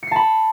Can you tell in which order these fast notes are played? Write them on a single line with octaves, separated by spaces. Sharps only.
C#7 C7 A5 B5